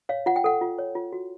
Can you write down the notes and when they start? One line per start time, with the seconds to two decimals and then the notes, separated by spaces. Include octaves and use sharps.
0.09 C#5 F5
0.26 F4 F#5
0.36 G5
0.44 A4 F#5
0.61 F4
0.79 C#5
0.95 F4
1.13 F#4